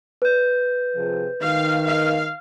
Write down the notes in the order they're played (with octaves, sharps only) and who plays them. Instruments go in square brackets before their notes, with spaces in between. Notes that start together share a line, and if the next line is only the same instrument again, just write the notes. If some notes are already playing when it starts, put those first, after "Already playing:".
[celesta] B4 G6
[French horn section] C3 F3 G#4
[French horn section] D#3 [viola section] F5
[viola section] F5